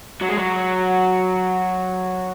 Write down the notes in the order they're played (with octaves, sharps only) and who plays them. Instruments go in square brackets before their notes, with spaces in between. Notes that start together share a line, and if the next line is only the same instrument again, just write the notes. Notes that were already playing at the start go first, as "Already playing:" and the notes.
[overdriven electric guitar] F#3
G#3
F#3